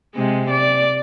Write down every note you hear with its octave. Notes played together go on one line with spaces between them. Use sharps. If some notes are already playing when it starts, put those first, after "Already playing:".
C3 G#3
D5